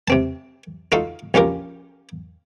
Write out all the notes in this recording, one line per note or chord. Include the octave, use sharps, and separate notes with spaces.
C3 C4 A5
D#4 F4 F#4 A4 F5
A#1 C#4 F4 G4 A#4